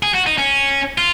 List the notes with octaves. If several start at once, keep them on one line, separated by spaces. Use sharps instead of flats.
G#4
F#4
D#4
C#4
F4